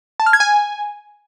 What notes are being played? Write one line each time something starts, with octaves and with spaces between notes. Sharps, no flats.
A5
F6
G#6
G#5